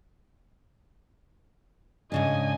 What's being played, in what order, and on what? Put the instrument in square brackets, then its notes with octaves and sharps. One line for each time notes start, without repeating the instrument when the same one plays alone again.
[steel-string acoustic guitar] G#2 C#3 D4 [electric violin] D#5 G#5